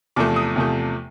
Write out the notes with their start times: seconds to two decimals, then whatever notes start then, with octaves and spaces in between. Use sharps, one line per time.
0.16 E2 C3 F3 A3 D6
0.36 D#6
0.56 E2 C3 F3 A3